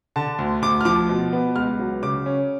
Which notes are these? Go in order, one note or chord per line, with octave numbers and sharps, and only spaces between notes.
D3 A5
D2
D2 D6
F6
F3 D6
B2
B3
C#2 F6
F#3
C#3 D6
C#4